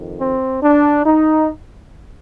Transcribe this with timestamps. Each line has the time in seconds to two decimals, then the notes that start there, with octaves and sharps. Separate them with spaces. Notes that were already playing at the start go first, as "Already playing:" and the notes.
Already playing: F2 D#3
0.20 C4
0.63 D4
1.06 D#4